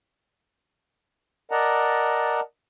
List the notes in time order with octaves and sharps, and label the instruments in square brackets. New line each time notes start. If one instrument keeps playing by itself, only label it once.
[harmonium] A#4 D5 D#5 F#5 A5 A#5